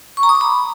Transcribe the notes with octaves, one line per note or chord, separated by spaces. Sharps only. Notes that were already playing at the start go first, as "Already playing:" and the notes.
C#6
A#5
D#6
D6
B5